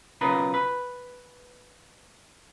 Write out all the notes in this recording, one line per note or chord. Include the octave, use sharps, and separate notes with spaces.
B1 C#3 F4 A#4 B4
B4